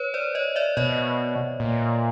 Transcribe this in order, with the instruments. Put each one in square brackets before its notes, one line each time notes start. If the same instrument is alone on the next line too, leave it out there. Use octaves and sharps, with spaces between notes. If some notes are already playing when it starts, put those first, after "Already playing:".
Already playing: [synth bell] B4 C#5
C5 D5
C#5 D#5
D5 E5
[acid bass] B2 [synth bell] C#5 D#5
[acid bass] A#2